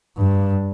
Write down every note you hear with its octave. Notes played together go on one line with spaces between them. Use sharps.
G2